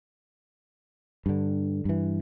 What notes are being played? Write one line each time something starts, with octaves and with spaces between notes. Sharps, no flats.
G2 D3
G2 E3